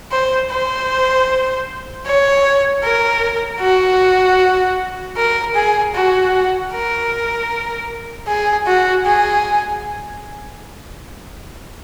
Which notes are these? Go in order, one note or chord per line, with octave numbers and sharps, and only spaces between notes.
C5
C5
C#5
A#4
F#4
A#4
G#4
F#4
A#4
G#4
F#4
G#4